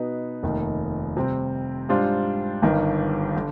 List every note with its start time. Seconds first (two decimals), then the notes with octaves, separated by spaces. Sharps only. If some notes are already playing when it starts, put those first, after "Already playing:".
Already playing: B2 B3 D#4 B4
0.43 F1 D#2 D#3
1.17 C3 G3 C4
1.89 G#2 G3 D4 F4 C5
2.62 G1 G2 D#3
3.36 D3